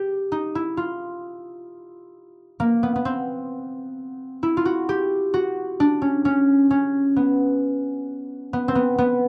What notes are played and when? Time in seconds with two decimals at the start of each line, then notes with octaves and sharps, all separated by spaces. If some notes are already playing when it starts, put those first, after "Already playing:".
Already playing: G4
0.32 D#4
0.55 E4
0.77 F4
2.60 A#3
2.83 B3
2.96 B3
3.05 C4
4.43 E4
4.57 F4
4.65 F#4
4.89 G4
5.34 F#4
5.80 D4
6.02 C#4
6.25 C#4
6.70 C#4
7.16 B3
8.53 B3
8.68 C4
8.75 B3
8.98 B3